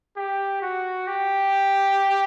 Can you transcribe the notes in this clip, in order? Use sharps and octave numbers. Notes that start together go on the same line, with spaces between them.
G4
F#4
G4